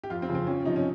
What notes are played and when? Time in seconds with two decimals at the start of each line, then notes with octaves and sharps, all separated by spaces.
0.04 G4
0.10 F2 F4
0.22 C4
0.29 C#3 F3
0.35 C4
0.47 F2 C#4
0.65 C3 F3 D#4
0.76 C#4